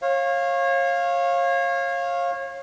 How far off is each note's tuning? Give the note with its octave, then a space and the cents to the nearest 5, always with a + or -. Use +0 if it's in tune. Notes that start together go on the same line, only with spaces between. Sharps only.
C#5 -30 F5 +0